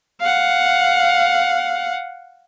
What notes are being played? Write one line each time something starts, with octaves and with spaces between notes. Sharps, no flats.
F5 F#5